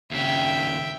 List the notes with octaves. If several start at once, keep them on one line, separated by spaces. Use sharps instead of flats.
D#2 C#3 E5 G5